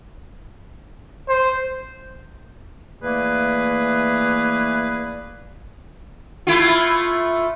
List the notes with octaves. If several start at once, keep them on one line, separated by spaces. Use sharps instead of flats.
C5
E3 A3 A#3 G#4 B4 D5
A3 E4 F4